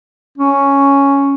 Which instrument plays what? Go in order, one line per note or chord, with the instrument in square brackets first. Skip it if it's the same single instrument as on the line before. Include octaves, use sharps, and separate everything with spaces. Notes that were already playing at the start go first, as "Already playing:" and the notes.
[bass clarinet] C#4